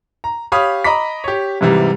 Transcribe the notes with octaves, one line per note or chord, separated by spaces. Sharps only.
A#5
G4 C#5 F5 B5 D#6
D#5 A#5 B5 D6 B6
G4 C#5
G#2 C3 E3 G3